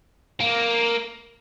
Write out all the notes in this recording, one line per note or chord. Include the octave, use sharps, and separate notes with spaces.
A#3